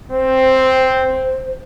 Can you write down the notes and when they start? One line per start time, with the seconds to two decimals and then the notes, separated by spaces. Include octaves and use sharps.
0.11 C4 C5